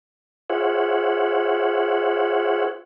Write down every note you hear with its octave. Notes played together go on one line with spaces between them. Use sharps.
F4 G#4 C5 C#5 E5 F#5